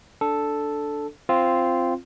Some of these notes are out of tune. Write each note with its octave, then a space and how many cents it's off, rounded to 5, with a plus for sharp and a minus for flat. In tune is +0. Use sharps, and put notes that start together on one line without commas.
D4 +0 A4 +0
C4 +0 F4 -10